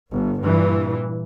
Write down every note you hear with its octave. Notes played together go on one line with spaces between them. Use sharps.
G1
G2 A#2 E3